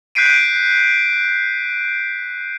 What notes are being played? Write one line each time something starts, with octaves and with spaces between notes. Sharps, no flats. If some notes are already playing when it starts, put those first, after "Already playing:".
F#6 G6 B6 C7 D7 D#7